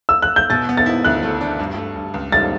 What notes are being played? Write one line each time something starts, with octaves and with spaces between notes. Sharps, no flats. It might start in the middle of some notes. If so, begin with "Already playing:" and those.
E6
F#6
G6
B2 A6
B3
A6
E4
D2 F#6
A3
D4
G2
A3
G2
C#2
G3 A6